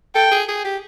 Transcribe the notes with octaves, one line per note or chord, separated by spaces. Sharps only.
A4 G5
G#4
G#4
G4